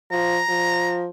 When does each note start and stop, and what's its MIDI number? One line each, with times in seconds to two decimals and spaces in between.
0.11 0.40 53
0.11 1.02 82
0.49 1.07 53